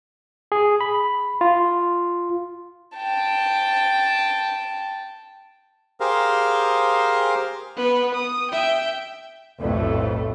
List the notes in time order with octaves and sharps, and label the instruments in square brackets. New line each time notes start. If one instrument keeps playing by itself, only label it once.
[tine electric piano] G#4
B5
F4
[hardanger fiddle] G5 A5
[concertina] G4 G#4 A#4 C5 F5
[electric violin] B3 B4
D#6
E5 G5
[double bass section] B1 F2 A2 A3